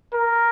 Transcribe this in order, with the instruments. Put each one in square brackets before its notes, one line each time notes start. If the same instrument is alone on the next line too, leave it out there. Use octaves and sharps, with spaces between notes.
[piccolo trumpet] A#4